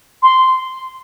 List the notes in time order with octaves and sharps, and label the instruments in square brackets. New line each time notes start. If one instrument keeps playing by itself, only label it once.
[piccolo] C6